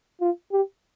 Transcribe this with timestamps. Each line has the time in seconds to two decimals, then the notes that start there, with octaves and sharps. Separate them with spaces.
0.21 F4
0.52 G4